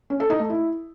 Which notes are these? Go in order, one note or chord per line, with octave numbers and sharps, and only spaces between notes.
C#4
A4
D#4
A3
E4